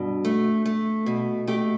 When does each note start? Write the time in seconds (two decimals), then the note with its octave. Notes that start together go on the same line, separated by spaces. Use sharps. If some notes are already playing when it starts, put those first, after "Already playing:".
Already playing: G2 B2
0.25 A3
0.66 A3
1.06 B2
1.47 A3 G4